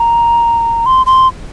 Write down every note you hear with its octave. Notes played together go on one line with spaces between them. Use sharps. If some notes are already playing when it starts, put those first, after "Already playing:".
Already playing: A#5
C6
C6